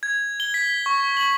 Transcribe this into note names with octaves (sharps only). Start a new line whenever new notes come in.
G#6
G7
B6
C#6
F#7